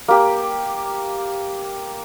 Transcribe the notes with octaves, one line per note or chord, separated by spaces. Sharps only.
A#3 G4